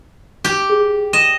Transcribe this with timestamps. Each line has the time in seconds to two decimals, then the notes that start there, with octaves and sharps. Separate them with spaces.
0.44 G4
0.69 G#4
1.13 D#5 E7